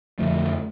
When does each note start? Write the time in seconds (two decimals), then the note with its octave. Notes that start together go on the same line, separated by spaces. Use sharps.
0.19 F2 D3 F3 A3